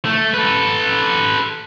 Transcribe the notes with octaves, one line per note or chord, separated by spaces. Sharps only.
A3
A4 B4